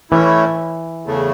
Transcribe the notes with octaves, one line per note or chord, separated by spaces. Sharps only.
A2 E3 A3 C#4 E4
E2 C#3 A3